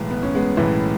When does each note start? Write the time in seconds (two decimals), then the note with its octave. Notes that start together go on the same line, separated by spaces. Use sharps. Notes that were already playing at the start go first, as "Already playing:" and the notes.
Already playing: B1 A2 E3 G#3 B3
0.11 B3
0.23 C#4
0.35 G#3 B3
0.57 B1 A2 E3